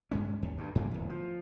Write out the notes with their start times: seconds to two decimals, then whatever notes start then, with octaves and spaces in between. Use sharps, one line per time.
0.11 G2 G#3 C#4
0.42 D#2
0.58 D2 G2
0.75 G2 C#3 F3 A#3
0.91 D1 E2
1.10 F3